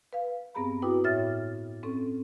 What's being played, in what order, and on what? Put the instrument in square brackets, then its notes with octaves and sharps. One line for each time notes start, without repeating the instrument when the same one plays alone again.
[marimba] B4 F5
G2 B3 C4 G#4 A#5 B5
E4 F#4 B4 G5 D6 D#6
A2 C#5 E5 F6 A6
C4 C#4 A4